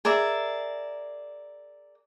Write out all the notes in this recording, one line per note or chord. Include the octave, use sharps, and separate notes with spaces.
G#4 A#4 D5 E5